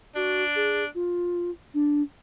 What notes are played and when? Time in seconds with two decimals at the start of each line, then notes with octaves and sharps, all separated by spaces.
0.15 D4 F#4
0.56 G#4
0.95 F4
1.74 D4